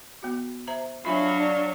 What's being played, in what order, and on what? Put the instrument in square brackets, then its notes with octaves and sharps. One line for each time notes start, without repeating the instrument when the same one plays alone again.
[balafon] B3 F#4
C5 E5 A#5
[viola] F#3 C#5 [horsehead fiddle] D4 F5 [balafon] F4 E5 G#5 [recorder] B5
[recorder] D5